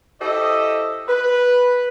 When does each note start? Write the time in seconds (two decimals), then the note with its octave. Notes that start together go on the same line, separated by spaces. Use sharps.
0.21 E4 G4 A4 C5 D#5
1.09 B4